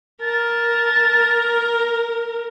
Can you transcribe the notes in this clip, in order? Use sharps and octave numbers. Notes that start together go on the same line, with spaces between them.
A#4 A5